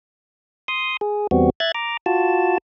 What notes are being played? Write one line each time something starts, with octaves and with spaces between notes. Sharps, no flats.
C6 D#6
G#4
E2 G3 B3 C4 F#4
E5 F#6 G#6 A6
A#5 D6
F4 F#4 A5